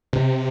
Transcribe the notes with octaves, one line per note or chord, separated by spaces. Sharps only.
C3